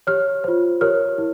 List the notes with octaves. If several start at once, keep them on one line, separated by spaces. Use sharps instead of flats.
G4 C#5 F6
F4 C5
G4 A#4 C#5 F6
E4